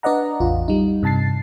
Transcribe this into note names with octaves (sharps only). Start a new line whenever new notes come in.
D4 B4 D5 D#5 F#5 A#5
A1 E2 F4
G3 D#4
G2 C3 A5 A6 C7